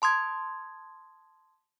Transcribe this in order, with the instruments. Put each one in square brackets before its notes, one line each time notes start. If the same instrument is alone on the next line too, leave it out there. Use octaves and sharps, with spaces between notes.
[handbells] A5 C6 D#6 G#6